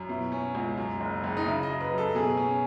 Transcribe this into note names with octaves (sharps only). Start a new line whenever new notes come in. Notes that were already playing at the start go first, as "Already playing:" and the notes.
Already playing: F#2
B2 E4
C#4
C#2
F#2
F#1
F#1
D#4
C#3 E4
D#5
F#2
B4
F#2
A4
B2 G#4
C#4